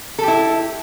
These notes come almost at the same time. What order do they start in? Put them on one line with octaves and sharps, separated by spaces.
A4 G4 E4